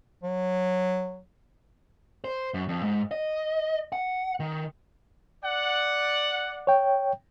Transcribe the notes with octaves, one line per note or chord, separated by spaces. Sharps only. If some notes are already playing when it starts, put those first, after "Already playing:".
F#3
C5
F#2
F2
G#2
D#5
F#5
D#3
D5 F#5
C#5 G5